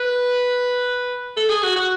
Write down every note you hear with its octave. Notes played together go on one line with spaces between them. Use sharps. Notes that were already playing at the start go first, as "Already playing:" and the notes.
Already playing: B4
A4
G#4
F#4
F#4